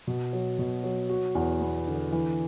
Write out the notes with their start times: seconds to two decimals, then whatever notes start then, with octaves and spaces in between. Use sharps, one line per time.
0.07 B2
0.33 F#3
0.59 B2
0.84 F#3
1.09 F#4
1.35 E2
1.61 B3
1.88 D3
2.12 E3